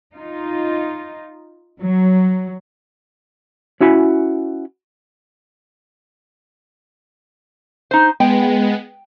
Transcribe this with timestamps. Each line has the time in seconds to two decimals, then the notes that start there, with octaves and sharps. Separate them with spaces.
0.13 D#4 F4
1.79 F#3
3.80 C#4 E4 F#4 G#5 B5
7.91 D#4 C5
8.20 G#3 B3 G5